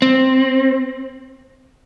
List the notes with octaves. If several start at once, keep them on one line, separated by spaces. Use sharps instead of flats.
C4